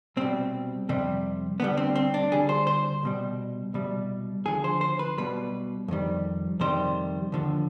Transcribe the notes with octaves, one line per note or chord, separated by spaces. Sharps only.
C2 B2 G3 C4
F2 C3 G3
D2 D3 G3 B3
C4
C4
D4
D2 D3 G3 G#4
C5
C5
C2 B2 G3
C2 B2 G3
D#2 D3 F3 G#4
C5
C5
B4
B1 B2 G3 B4
F2 D#3 G3
F2 C3 D#3 G3 C5
D#2 D3 F3